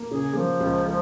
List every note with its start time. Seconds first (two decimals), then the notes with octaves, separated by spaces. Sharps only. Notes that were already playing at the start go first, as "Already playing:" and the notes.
Already playing: A#3
0.11 C#3 G#4
0.35 F3 A#3
0.60 C#2
0.85 G#3